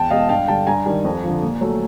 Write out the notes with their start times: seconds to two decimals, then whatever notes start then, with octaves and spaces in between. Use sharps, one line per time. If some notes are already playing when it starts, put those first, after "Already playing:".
Already playing: E2 G5 A5
0.10 B2 G#3 B3 D#5 F5
0.29 G2 F5 G5
0.48 D3 G3 G5 A5
0.67 G2 G#5 A#5
0.86 D#3 G3
1.04 F2
1.24 D3 F3
1.43 A#2
1.61 F#3 A3